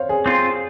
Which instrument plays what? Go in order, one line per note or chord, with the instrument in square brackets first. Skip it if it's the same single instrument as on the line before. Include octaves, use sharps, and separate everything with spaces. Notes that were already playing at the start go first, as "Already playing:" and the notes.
Already playing: [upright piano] C5 C#5 F5
G#4
[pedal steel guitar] C4 F4 C5